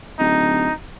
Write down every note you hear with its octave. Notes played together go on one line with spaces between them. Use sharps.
D1 D#4